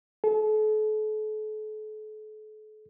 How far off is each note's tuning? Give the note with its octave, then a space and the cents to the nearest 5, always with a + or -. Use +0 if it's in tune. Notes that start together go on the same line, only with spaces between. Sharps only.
A4 -40